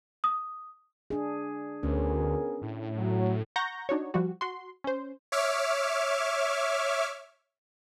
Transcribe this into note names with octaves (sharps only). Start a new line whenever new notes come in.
D#6
D4 G#4
D2 B3 C#4 G#4 A#4
A2
F#3
F#5 A#5 C#6 G6 A#6
D4 D#4 F#4 C#5
F3 G3 F#4
F#4 C6
C#4 C5
C#5 E5 D6 F6